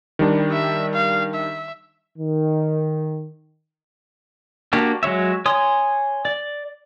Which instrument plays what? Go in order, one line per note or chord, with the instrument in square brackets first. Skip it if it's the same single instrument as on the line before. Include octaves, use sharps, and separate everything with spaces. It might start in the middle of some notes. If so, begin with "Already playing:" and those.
[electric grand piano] D#3 G3 D4
[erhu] E5
F5
E5
[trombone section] D#3
[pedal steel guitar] A#3 D4 F#4 G4
F#3 G#3 C#5 E5
C#5 G#5 C6 D#6
D5